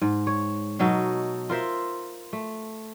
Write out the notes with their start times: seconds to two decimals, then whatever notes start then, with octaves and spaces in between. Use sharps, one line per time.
0.02 G#2
0.27 C#5
0.79 B2 F#3 D#4 A4
1.50 F4 A#4 C5 E5
2.33 A3